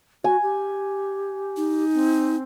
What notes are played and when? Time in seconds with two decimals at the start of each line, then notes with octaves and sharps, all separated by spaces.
0.24 F#4 G#5
0.43 G4
1.57 D#4
1.94 C4